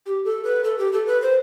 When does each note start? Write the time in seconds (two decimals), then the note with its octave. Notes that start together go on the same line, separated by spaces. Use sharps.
0.06 G4
0.25 A4
0.44 B4
0.64 A4
0.78 G4
0.93 A4
1.07 B4
1.22 C5